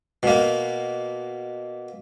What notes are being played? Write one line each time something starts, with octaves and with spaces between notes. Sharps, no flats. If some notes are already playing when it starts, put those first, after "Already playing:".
B2 A#3